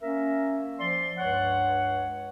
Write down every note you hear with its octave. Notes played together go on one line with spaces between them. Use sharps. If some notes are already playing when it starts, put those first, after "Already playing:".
A#3 C#4 A#4 E5
F3 D5 C6
C#2 G2 C#5 F#5